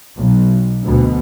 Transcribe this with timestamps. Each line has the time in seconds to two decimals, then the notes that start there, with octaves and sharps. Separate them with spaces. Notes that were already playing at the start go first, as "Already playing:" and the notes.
0.17 B1
0.83 D2 B2